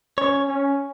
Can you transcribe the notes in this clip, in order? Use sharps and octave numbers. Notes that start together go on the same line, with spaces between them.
C#4 C#5
C#4